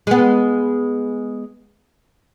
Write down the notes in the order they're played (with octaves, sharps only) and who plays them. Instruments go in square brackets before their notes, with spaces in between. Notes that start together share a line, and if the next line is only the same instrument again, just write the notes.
[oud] G#3 B3